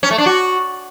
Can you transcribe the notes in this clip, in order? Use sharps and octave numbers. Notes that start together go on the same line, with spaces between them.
C#4
A3
D4
F#4